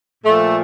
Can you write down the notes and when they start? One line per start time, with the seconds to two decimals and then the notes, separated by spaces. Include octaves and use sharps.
0.24 A#2 F3 A3